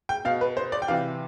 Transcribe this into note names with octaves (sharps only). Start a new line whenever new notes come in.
G5
B2 F5
B4
C5
D5
G5
C3 E3 F5